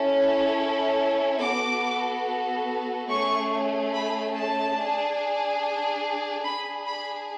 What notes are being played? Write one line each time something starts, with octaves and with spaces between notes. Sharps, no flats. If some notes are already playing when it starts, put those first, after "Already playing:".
Already playing: C#4 E4 A4
B3 F#4 A4 D6
A3 C#4 G#4 C#6
B5
A5
D4 G#4
D4 G#4 B5
B5